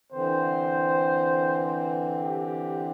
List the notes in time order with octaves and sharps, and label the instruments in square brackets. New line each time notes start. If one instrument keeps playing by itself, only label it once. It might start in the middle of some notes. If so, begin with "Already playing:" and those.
[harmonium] D3 E3 C4 [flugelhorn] C5
[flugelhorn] G4